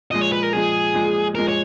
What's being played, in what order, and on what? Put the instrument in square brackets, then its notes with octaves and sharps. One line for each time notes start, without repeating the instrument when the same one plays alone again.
[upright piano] A#2 F3 G#3 [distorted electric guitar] D#5
[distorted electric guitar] C#5
B4
A#4
[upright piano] A#2 F3 G#3 [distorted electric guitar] G#4
[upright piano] A#2 F3 G#3
[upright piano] A#2 F3 G#3 [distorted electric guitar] A#4
[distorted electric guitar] C#5